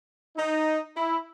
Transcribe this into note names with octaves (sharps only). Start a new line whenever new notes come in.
D#4
E4